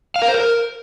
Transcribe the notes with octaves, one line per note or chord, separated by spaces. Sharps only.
F5
A#4
C5
A#4